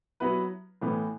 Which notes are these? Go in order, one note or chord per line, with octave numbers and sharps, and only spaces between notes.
F#3 B3 E4 B4
A2 E3 B3